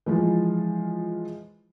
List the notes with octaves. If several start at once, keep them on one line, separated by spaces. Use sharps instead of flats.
E3 F3 G#3 F4